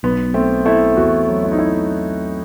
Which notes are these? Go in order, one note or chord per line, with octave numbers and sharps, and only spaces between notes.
B1 B3
A3 C4
A3 E4
E2 F#4
F#3
E4
D#4
C4 E4